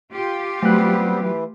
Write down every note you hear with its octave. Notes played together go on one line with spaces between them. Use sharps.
F4 G4
F#3 G3 A3 B3 C4 F#6
E3